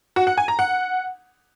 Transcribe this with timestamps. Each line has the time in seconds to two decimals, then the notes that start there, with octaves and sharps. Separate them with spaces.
0.16 F#4
0.27 F#5
0.38 G#5
0.48 A#5
0.59 F#5